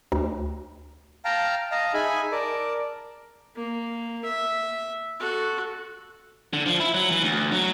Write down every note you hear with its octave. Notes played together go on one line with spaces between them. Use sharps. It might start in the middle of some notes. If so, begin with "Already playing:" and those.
D2
F5 G5 A5 A#5
D#5 F5 A5 A#5
D#4 G#4 E5 G#5 B5
A#4 D5 A5
A#3
E5
F#4 A4
D3
F3
E4
F#3
E3
D2
F#3